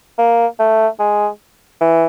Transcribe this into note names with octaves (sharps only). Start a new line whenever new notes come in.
A#3
A3
G#3
E3